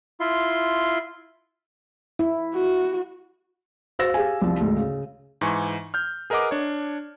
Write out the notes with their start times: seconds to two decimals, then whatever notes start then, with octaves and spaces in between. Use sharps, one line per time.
0.20 E4 F4 C6
2.19 E4
2.55 F#4
3.99 F#4 C5 F5 E6 A6 A#6
4.14 G4 G#4 F5 G#5
4.42 C2 F3
4.60 D2 G#2
4.76 C#3
5.41 G#2 E3 G#5 C#6
5.94 F6 G6
6.30 G#4 A#4 B4 D#5 F#5 D6
6.51 D4 C#5